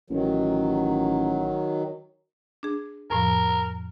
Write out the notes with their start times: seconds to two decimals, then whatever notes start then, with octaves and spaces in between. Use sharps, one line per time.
0.10 A1 D#3 F#3
2.63 D4 G#4
3.10 F2 A2 F3 A#4